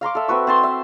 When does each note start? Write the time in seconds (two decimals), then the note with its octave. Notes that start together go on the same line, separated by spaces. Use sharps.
0.01 F5 A#5 C6 D6
0.15 A4 E5
0.28 C4 F#4 B4 C#6
0.47 C4 A5 C6
0.63 E5